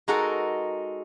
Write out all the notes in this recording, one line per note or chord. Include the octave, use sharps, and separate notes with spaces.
G#3 D#4 F#4 A4 A#4